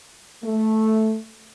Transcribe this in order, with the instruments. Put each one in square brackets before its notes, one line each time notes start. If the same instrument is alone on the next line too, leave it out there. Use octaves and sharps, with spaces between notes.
[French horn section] A3